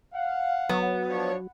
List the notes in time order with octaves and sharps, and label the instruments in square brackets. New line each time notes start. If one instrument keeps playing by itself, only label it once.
[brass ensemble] F5 F#5
[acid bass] F#3 [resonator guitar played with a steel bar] B3
[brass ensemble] F3 D4 C#5